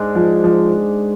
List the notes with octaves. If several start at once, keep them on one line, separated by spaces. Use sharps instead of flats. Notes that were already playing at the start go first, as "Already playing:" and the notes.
Already playing: G#2 G#3 D4
F3
F3